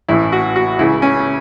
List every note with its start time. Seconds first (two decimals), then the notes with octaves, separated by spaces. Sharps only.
0.09 A1 A2 E3 E4
0.32 F#4
0.56 F#4
0.79 C#2 C#3 E3 E4
1.02 C#4